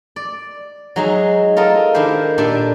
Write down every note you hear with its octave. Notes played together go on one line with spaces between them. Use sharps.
D5
F#3 G#3 D#4 G#4 E5
F4 A4 A#4 D#5
D#3 D4 E4 G4 C5
A#2 D4 G4 A4 E5